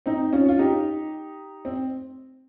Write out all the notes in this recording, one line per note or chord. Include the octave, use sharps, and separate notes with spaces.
C4 D#4
C#4 F4
F4
D#4 G4
C4